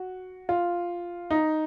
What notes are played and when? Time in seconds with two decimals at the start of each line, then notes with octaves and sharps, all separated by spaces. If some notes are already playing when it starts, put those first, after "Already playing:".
Already playing: F#4
0.49 F4
1.31 D#4